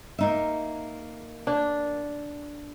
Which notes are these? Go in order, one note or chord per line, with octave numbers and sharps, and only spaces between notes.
A#3 D#4 E5
D4